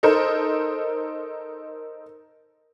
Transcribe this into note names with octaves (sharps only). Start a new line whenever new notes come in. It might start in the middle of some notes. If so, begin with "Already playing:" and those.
D#4 A4 A#4 C5